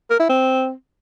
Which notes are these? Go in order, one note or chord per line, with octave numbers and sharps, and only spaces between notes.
A#4
E4
C4